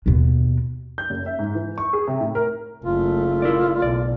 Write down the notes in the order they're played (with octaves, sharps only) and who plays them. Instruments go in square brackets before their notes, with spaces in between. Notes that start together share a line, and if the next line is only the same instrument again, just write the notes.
[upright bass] D#2 B2
[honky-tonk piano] G6
F#1
E5
G#2
E3
C#6
G#4
C3
A2
A#4
[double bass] F#1 A3 [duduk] F4
[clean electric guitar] E4 A#4 D5
[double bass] B1 [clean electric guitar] D5